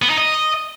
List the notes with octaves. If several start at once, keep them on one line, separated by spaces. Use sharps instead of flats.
B3
D#4
D#5